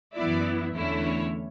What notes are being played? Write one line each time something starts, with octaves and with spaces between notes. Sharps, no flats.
F#2 E3 B3 E4 D5
E2 D3 A3 C#4 E4
C#5